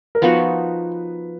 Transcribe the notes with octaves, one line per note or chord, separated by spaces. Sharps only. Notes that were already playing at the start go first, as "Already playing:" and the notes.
A#4
F3 B3 D#4 F#4 B4